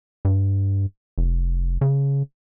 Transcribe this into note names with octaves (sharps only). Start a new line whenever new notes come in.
G2
F1
C#3